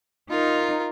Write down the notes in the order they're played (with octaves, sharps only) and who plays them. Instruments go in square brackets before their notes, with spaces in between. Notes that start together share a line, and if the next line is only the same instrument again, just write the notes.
[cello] D#4 [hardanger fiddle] F4 A#4